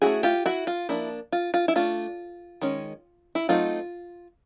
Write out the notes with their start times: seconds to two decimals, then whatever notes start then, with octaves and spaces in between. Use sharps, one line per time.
0.02 A3 C#4 E4 F#4 G#4
0.23 F4 G4
0.46 E4 F#4
0.67 F4
0.89 F3 A#3 D4 E4
1.32 F4
1.54 F4
1.68 E4
1.76 A3 D4 F4
2.61 D#3 G#3 C#4
3.35 E4
3.49 F#3 A3 C4 D#4 F4